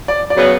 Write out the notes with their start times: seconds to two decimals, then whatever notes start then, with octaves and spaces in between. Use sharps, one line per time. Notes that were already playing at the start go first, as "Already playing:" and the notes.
0.08 D5
0.30 D5
0.36 C#3 F#3 B3